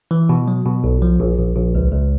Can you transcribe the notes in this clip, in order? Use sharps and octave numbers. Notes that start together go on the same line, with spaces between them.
E3
B2
F#3
B2
B1
F3
A#1
A#1
A#1
C#2
C#2